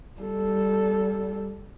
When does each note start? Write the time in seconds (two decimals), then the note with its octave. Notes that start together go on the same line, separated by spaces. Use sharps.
0.21 G3 A4